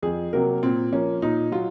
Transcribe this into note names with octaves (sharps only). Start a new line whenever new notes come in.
F2 G#4
C3 F#3 A#3 A#4
A#2 C4
F3 A#3 C#4
A#2 D#4
F#3 F4